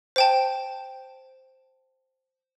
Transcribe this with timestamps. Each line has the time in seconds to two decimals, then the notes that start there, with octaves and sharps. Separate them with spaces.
0.16 C5 G5 A5